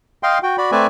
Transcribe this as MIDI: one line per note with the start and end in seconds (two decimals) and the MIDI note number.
0.23 0.39 75
0.23 0.39 77
0.23 0.39 79
0.23 0.39 84
0.43 0.56 66
0.43 0.56 79
0.58 0.71 66
0.58 0.71 74
0.58 0.71 83
0.72 0.87 57
0.72 0.87 60
0.72 0.87 71
0.72 0.87 74
0.72 0.87 76
0.72 0.87 80